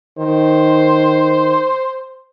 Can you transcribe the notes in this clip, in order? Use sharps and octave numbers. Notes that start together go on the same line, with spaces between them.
D#3 C5